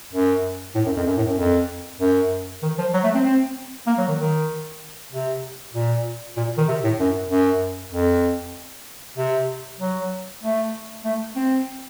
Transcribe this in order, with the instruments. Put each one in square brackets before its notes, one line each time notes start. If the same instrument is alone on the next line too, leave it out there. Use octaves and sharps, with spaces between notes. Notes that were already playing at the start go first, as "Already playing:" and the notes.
[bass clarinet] F#2
A2
F#2
F2
F#2
A2
F#2
F2
F#2
D#3
F3
F#3
A3
C4
C4
A#3
F#3
D#3
D#3
C3
A#2
A#2
D#3
C3
A2
F#2
F#2
F2
C3
F#3
A3
A3
C4